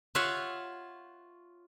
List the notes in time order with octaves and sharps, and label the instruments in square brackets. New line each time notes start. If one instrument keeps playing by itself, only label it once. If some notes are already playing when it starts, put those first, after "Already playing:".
[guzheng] F4 C#5 E5 F#5